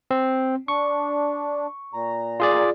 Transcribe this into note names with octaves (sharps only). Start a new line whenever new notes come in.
C4
D4 C#6
A#2 A#5
F4 G#4 D5